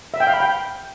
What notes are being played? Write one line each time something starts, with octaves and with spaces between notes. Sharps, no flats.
E5
G5
F5
B5
G5